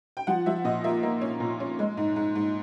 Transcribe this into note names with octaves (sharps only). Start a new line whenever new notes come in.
G5
F3 F#5
F3 E5
A#2 D#5
A#3 E5
A#3
C#4
A#2
C#4
G#3
G#2
G#2
G#2